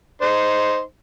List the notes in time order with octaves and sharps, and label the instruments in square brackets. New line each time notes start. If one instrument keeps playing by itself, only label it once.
[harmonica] D#4 C5